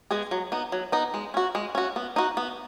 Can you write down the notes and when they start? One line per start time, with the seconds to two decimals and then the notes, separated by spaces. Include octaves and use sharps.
0.11 G#3 B3 G#4
0.31 F#3
0.52 B3 D#4
0.72 F#3
0.92 B3 D#4
1.14 G#3
1.34 C#4 F#4
1.55 G#3
1.75 C#4 F#4
1.96 B3
2.16 D#4 F#4
2.37 B3